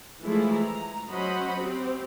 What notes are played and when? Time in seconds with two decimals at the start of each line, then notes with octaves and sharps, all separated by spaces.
0.23 E3 F3 G#3 A3 E4 F4
0.54 A#5
1.10 F#3 C#4 C5 D#5 F#5 B5
1.61 C4 G4